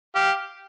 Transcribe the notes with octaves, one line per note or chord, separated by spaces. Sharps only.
G4 F5